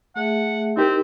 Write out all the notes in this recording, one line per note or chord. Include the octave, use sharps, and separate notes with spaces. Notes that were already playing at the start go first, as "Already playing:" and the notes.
A3 G#4 E5 F#5
C4 D#4 E4 G4 A#4